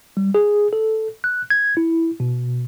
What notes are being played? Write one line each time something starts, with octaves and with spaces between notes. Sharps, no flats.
G3
G#4
A4
F#6
G#6
E4
B2